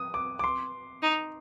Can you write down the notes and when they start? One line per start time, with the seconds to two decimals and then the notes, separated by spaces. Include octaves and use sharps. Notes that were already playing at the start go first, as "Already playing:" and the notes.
Already playing: D#6
0.14 D6
0.39 D6
0.44 C6
1.03 D#4